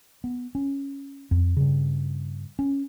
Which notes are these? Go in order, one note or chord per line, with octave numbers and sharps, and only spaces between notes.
B3
C#4
F2
G2 C#3
C#4